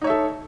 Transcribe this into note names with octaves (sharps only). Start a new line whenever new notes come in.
D#4 A4 C#5 E5